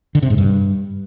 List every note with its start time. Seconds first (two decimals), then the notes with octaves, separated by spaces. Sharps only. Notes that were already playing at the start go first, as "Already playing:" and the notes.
0.15 D3
0.23 C3
0.30 G#2
0.38 G2